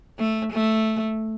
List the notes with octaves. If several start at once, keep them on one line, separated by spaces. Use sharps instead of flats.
A3
A3